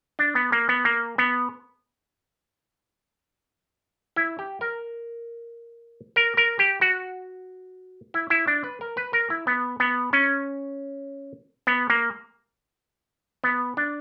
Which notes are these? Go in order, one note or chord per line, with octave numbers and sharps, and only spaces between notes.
D4
B3
A#3
B3
A#3
B3
E4
G4
A#4
A#4
A#4
G4
F#4
E4
E4
D4
B4
A#4
B4
A#4
E4
B3
B3
C#4
B3
A#3
B3
D4